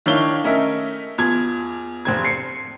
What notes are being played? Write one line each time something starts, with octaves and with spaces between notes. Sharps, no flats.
D#3 D4 E4 C#5 F5 G7
A3 C#4 A#4 D#5 E5
E2 F4 G#6
F1 C4 G#6
C7 C#7